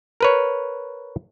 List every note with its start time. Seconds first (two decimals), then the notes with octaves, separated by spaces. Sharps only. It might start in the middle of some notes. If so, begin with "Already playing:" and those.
0.21 A#4 B4 C#5